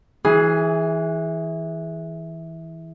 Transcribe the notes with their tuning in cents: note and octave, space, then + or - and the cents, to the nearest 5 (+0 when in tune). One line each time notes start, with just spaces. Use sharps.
E3 -15 G#4 +5